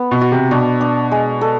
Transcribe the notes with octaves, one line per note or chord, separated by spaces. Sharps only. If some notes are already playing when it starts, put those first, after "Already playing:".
Already playing: B3
B2
F#4
C3
B2 D4
D4
G#3
A4